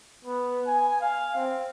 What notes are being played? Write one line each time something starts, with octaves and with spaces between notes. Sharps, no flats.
B3
G#5
F5
C4